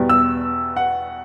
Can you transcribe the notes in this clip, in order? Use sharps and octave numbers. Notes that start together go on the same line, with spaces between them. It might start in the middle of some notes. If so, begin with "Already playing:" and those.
Already playing: E2 B2 G3
E6
F#5